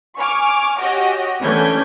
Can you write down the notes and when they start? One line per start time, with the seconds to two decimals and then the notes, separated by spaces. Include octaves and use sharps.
0.17 G#5 C#6 D6 F6
0.80 F#4 G4 C#5 D#5
1.41 E3 A3 C#4 D4 G6 G#6